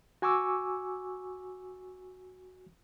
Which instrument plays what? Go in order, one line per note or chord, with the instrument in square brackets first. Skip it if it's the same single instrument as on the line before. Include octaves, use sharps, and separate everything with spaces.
[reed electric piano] F#4 G#5 C#6 D6 E6